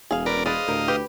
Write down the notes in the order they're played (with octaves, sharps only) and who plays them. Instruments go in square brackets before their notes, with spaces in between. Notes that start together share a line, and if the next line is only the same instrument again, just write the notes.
[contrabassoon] E1 [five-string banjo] G#4 F5
[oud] C4 C#4 [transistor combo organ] A#4 D5 [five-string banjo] B4
[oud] D4 G#4 C5 [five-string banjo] B4 D5 [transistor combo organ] D#5 F5
[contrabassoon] D2 [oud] A2 G4 A#4
[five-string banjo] G4 [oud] B4